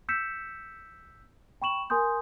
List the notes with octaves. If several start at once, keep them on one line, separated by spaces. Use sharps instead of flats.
E6 G6 B6 C#7 E7
G5 B5 C#6 E7 F#7
A#4 G#5 C6 D#6 G6